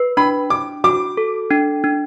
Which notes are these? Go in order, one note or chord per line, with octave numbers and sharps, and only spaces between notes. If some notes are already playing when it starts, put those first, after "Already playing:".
Already playing: B4
D4 B5
D4 D6
F#4 D6
A4
D4
D4